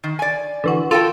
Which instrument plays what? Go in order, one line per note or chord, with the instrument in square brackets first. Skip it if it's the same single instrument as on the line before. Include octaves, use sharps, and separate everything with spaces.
[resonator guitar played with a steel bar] D#3
D5 G#5
[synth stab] D3 E3 F#4
[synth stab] F4 [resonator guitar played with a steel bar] A4 A#4 G5